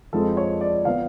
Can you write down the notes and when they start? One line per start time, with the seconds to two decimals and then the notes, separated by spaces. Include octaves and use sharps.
0.13 F2 F3 G#3 A4
0.37 C#5
0.61 D5
0.85 F3 B3 F5